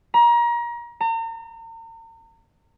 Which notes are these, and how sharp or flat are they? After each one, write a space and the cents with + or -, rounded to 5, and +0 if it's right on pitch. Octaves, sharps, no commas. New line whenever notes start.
A#5 +30
A#5 -40